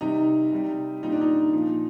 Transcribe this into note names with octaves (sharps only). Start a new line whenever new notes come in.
C3 G3 D#4
C3 G3
A#2 G3 D#4
D4
D#4
A#2 F3